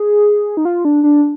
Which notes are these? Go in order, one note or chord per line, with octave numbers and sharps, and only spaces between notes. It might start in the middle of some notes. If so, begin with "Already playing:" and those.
Already playing: G#4
D#4
F4
D4
D4